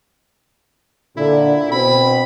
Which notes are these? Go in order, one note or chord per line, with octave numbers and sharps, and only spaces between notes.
A#2 D3 E4
B2 C4 B5